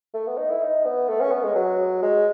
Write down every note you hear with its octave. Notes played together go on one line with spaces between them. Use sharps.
A3
B3
D#4
E4
D#4
B3
A3
C#4
B3
G#3
F#3
G#3